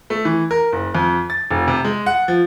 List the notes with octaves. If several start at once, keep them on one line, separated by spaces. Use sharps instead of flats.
A3
E3
A#4
F#1
F2
A6
F1
C3
G#3
F#5
F3